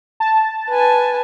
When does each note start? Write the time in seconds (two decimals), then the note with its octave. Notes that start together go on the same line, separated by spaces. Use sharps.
0.20 A5
0.70 B4 G#5